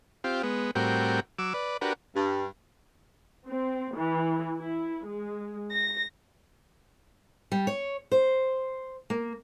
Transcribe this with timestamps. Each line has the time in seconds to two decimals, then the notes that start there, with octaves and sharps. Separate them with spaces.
0.24 C4 F4 G4
0.43 G#3 B3
0.75 A2 G3 C4 F#4 A#4 G5
1.39 F#3 D6 E6
1.54 B4 D5
1.81 D4 F#4 G4 A#4 B4
2.16 G2
3.47 C4
3.95 E3
4.58 E4
5.05 G#3
5.72 A#6
7.52 G3
7.67 C#5
8.12 C5
9.10 A#3